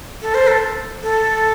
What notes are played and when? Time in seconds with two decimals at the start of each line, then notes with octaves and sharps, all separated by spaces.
0.22 A4
0.34 C5
0.48 A4
1.03 A4